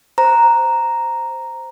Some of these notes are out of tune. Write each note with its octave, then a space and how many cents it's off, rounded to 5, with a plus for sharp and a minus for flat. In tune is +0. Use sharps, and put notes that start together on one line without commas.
C5 +0 A#5 +0